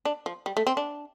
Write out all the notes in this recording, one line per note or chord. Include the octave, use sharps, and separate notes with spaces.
D4
F3
G3
A3
C4
D4